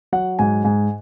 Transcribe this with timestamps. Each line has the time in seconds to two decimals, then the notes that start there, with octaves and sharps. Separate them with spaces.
0.12 F#3 F#5
0.39 G#2 G#5
0.64 G#2 G#5